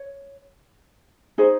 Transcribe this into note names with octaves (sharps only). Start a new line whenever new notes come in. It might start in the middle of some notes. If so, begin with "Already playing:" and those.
Already playing: C#5
D#4 G#4 C5